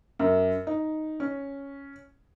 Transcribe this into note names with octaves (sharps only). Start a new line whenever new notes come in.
F#2
D#4
C#4